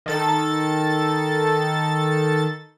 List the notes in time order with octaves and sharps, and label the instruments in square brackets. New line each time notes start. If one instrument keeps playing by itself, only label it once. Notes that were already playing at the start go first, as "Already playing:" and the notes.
[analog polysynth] D#3 A4 A6